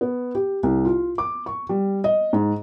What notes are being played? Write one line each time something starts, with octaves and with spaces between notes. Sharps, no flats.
B3
G4
C2
F4
D6
C#6
G3
D#5
G#2